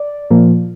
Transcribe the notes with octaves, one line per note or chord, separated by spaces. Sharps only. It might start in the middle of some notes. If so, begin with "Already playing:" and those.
Already playing: D5
A#2 F3 A#3